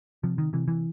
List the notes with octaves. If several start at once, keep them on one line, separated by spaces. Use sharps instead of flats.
C3 F3
D#3
C3 E3
E3